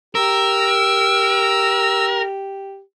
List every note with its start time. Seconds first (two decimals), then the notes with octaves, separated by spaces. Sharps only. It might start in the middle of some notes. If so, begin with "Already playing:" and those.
0.15 G4 A#4 E6